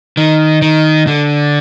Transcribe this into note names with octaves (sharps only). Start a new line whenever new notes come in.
D#3
D#3
D3